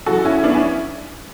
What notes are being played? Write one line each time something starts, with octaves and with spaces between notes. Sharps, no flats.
F#2 C#3 E3 F#4 A4
C#4 E4
B3 D4
C#4 E4